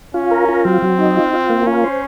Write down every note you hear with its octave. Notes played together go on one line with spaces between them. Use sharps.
C#4 F4
A#4
F4
F#3 C4
F#3
D#4
F4
F4
A#3
C#4 F4
C5